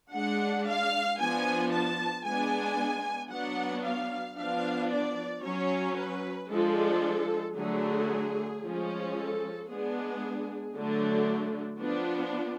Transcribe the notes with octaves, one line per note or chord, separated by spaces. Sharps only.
G#3 D4 F#5
F5
F3 B3 D4 G#5
A5
G#3 B3 D4 G#5
F#3 B3 D4 F#5
F5
F3 B3 D4 F5
D5
F#3 C#4 C#5
B4
F3 G#3 D4 A4
D3 F#3 A3 D4 G#4
F3 G#3 C#4
A4
G#3 B3 D4 G#4
D3 F#3 A3 D4
F3 B3 D4